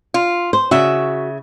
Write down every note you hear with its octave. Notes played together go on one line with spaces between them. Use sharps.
F4
C5
C#3 F#4 E5